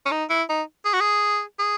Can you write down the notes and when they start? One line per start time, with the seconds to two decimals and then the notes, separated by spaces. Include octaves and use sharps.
0.06 C#4
0.11 D#4
0.30 E4
0.49 D#4
0.85 G#4
0.94 F#4
1.01 G#4
1.59 G#4